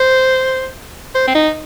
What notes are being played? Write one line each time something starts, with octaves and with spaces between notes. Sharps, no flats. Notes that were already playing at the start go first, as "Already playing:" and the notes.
Already playing: C5
C5
C4
D#4